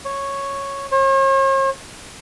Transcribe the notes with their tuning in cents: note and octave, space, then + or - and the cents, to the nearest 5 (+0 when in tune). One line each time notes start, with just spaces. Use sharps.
C#5 -5
C#5 -45